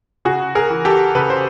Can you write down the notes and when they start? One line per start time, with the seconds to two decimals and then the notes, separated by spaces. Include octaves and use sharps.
0.25 C#3 F#4 G#4
0.55 G#4 A#4
0.70 E3
0.85 G4 A4
1.15 C#3 A4 B4
1.30 C5